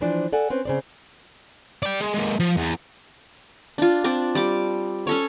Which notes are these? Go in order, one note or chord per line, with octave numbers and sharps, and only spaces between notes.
E3 F3 D4 C5 D5
A4 D5 F#5 G#5
C4 C#4 B4
C#3 C4 D5
D5 G5
G#3
G#3 A#3
F3
E2
D4 F4
C4 D4 D5
G3 D6
C#4 A4 C#5